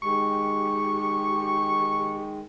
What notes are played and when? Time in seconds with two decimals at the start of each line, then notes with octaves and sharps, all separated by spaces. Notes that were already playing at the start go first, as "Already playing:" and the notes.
0.02 D#3 G#3 G4 C#6